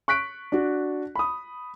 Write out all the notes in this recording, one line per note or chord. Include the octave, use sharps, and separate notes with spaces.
C#6 F#6 B6 D7
D4 F#4
B5 D#6